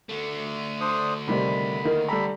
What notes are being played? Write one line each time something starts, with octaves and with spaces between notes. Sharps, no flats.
D3 A3
D4 C5 D#6
C3 D#3 G3 B5
D#3 A#3
G3 A4 A#5 B5